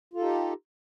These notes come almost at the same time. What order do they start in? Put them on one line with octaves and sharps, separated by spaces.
F4 A4 D#4 G4